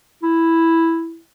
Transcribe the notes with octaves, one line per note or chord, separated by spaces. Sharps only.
E4